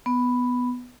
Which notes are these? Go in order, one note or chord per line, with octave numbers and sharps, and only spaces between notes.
B3